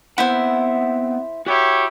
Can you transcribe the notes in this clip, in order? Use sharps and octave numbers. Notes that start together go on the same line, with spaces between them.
B3 C4 E4 C5 F#5
E4 F#4 G4 C#5